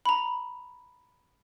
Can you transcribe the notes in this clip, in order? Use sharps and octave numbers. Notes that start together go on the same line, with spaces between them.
A#5 B5